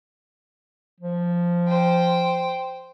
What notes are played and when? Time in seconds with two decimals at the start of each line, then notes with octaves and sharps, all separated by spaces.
1.00 F3
1.68 C5 G5